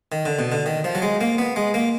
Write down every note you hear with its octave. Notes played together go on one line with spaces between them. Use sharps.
D#3
D3
B2
D3
D#3
F3
F#3
G#3
A#3
B3
G#3
A#3